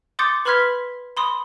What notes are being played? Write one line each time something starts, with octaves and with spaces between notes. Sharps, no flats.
C6 D6 D#6 G6 A6 C#7
B4 B5 C6 F6 G#6 B6
B5 C6 D#6